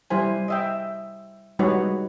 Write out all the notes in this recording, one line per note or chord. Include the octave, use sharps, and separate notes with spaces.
G3 E4 C5 G#5
D#5 E5 G5
G3 G#3 D#4 F#4 B4 C#5